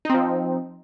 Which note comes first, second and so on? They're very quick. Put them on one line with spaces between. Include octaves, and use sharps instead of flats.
D#4 C4 F3